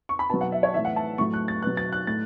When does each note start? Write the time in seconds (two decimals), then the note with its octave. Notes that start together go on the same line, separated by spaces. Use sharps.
0.09 C#6
0.19 B5
0.30 B2 F#3 A5
0.41 F#5
0.52 E5
0.63 C#5
0.74 A2 E3 E5
0.85 F#5
0.96 A5
1.18 A2 F#3 C#6
1.34 F#6
1.48 A6
1.62 B2 F#3 F#6
1.77 A6
1.92 F#6
2.07 A2 A6